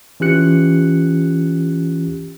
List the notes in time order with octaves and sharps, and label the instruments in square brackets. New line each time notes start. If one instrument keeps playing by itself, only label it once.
[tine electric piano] E3 C#4 F4 G4 F#6 C#7